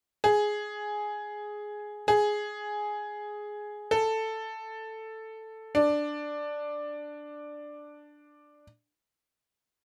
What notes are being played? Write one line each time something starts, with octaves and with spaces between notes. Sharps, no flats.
G#4
G#4
A4
D4